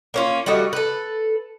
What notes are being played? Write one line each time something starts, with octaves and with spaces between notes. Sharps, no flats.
A#3 C#4 F4
G3 A3 F#4 D#5
A4 B4